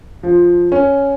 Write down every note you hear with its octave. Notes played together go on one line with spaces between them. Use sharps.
F3
C#4